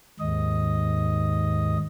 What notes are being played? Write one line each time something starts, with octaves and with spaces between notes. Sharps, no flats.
D#2 G#2 D#5